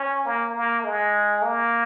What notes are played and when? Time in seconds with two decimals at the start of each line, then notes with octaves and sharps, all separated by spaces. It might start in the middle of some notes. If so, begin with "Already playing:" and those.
Already playing: C#4
0.25 A#3
0.55 A#3
0.84 G#3
1.42 A#3